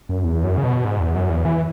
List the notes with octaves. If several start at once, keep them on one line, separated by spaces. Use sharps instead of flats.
F#2
E2
F#2
C#3
B2
G#2
E2
F#2
E2
E3